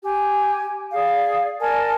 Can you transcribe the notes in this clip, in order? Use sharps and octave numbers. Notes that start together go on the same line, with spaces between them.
G4 G#5
G#4 D5 F5
A#4 D5 G#5 A5